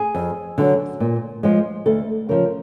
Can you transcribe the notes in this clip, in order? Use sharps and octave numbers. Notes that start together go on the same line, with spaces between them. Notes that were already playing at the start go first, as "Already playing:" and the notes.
Already playing: G#4
F2
D3 F#3
A#2
F3 G#3
D2 A4
C#3 F3 A#4